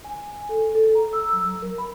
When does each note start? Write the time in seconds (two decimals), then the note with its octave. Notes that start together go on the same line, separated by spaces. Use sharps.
0.04 G#5
0.49 A4
0.75 A4
0.95 A#5
1.13 E6
1.33 F#3
1.62 A#4
1.78 B5